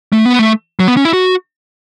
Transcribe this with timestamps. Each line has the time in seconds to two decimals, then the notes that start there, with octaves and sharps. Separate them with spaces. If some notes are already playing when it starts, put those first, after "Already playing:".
0.13 A3
0.26 B3
0.39 A3
0.80 F#3
0.88 B3
0.97 C#4
1.05 E4
1.13 F#4